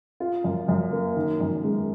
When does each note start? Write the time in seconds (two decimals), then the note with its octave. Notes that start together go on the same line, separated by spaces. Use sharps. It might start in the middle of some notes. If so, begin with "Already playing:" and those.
0.20 F4
0.44 F#2
0.68 F#2
0.92 A#3
1.16 D#3
1.40 F#2
1.64 G#3